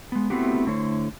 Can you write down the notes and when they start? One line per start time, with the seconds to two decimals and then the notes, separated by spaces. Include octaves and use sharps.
0.12 G#3 B3
0.30 A3 B3 C4 E4 F#4 G4
0.67 D3 A3 E4 C5 C#5